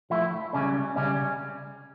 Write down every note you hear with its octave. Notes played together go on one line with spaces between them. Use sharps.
F3 A3 E4
C#2 C#3 G3 C#4
C#3 G3 C#4